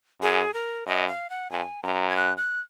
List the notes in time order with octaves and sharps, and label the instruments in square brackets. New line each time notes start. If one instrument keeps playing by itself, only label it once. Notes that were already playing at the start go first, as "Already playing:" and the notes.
[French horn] F#2 [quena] G#4
[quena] A#4
[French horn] F#2 [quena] D#5
[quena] F5
F#5
[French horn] F2 [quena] G#5
[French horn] F#2 [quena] A#5
[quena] G#6
F#6
F#6